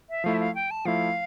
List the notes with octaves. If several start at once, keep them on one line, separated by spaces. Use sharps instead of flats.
E5
F3 A3 E4 F5
E5
F5
G5
A5
F3 A3 E4 F5